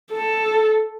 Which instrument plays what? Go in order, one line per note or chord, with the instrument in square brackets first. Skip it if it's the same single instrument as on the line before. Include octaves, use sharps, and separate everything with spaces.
[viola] A4